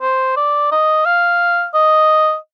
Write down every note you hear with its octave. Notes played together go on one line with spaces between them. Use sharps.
C5
D5
D#5
F5
D#5